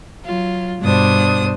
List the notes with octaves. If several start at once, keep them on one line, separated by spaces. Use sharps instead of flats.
F#3 F4
G2 B2 D4 C5 D#6